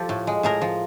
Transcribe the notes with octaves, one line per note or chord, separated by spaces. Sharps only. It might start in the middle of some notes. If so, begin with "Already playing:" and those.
Already playing: F3 G4 A4
A2
G#3
A2 G#4 A#4
F3